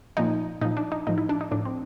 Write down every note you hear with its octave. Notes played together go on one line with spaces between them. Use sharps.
A#2 F3 D#4
A#2 F3 D#4
D4
D#4
A2 F3 D#4
E4
D4
D#4
A2 F3 D4
C4